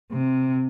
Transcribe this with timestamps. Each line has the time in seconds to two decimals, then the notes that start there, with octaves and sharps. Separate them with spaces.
0.12 C3